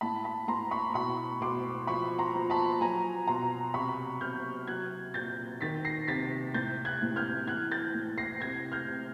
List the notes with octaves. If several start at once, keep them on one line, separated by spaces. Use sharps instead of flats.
A2 A5 B5
A5 B5
A2 A#5 C6
B5 C#6
B2 B5 C#6
B2 C6 D6
F3 B5 C#6
A#5 C6
F3
A5 B5
F#3 G#5 A#5
B2 A#5 C6
C3 B5 C#6
C3 F6 G6
F#3 F#6 G#6
A#2 G6 A6
D#3 A6 B6
A#6 C7
C3 A6 B6
A2 G6 A6
F#6 G#6
A2
F6 G6
E3 F#6 G#6
G6 A6
A2
A#6 C7
C3 G#6 A#6
F6 G6
C3